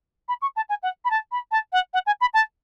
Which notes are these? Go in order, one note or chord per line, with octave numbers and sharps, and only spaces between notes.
B5
C#6
A5
G#5
F#5
B5
A5
B5
A5
F#5
F#5
G#5
B5
A5